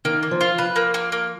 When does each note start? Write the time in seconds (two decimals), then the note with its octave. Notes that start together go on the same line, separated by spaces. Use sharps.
0.05 D#3 A#3
0.23 A#3
0.31 F3
0.41 F4
0.58 F3 B4
0.76 A#3
0.94 A#3
1.12 A#3